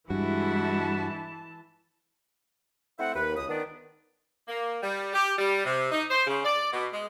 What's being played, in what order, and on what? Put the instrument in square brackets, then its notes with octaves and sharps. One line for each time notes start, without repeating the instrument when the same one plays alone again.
[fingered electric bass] G2 [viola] E3 A5 [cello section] G#3 E4 [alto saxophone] F#4
[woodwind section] A3 C4 E4 C5 E5 F#5
D#2 B4
C#2 D#6
D#3 B3 D4
[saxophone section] A#3
G3
G4
G3
C3
D#4
C5
C#3
D5
B2
G#3